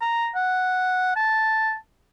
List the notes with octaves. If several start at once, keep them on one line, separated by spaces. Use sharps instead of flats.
A#5
F#5
A5